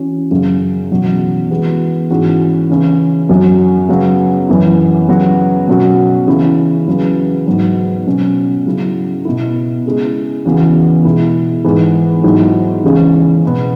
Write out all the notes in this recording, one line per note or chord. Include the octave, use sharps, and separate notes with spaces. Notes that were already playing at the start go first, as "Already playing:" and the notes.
Already playing: E3 C#4 F#4
F#2 C#3 F#3 C#4
E2 B2 F#3 C#4
E3 G#3 B3 F#4
G#2 E3 G#3 C#4 F#4
C#3 E3 C#4 E4
F#2 F#3 C#4 F#4
C#3 F#3 B3
F#2 E3 B3 E4
C#3 F#3 B3 F#4
B2 F#3 C#4 F#4
C#3 E3 C#4 E4
E2 C#3 F#3 B3
G#2 F#3 B3
B2 F#3 C#4
C#3 F#3 E4
B2 B3 E4
C#3 G#3 E4
E2 C#3 E3 B3 F#4
B2 G#3 E4
G#2 E3 G#3 B3
G#2 F#3 E4
E2 C#3 E3 G#3 C#4
E2 B2 B3